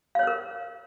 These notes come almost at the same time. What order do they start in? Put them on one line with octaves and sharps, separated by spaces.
F5 C#5 C5 A#4